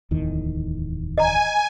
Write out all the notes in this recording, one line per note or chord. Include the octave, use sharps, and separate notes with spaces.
D1 E2 D#3
D#5 G#5 A#5